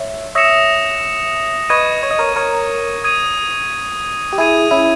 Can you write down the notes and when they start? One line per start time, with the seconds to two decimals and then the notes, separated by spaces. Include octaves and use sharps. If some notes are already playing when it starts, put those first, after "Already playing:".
Already playing: C#5 E5
0.35 C#5 E5 D#6 A#6 C#7 E7
1.69 B4 D#5 C#6 G#6 D#7
2.03 C#5
2.11 D#5
2.19 A#4 C#5
2.36 A#4 C#5
3.04 D#6 G#6 D#7
4.33 G4
4.38 E4 G#4 D#6 G#6 D#7
4.71 C#4 E4